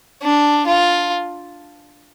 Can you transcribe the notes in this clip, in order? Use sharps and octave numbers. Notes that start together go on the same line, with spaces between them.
D4
F4